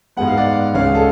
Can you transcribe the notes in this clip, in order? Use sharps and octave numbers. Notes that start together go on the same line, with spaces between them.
G#2 G#3 B3 F#5
F5
D5 F#5
C#2 C#3 G#3 C#5 F5
G#4
A4